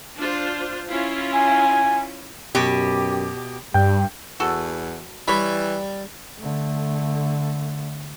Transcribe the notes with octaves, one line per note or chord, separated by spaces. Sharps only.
D4 F4 C5
C#4 E4 F4
G#5
F#2 B2 G4
G2 G3 G5 G6
E2 F#4 A4
E3 G3 C#5 B5
D3 A3